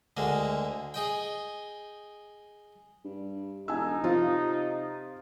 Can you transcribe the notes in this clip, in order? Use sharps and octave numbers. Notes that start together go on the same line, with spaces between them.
D2 D3 G#3 A#3
G#4 D#5 G5
G2
E1 D#4 G#5 E6
C3 F3 F4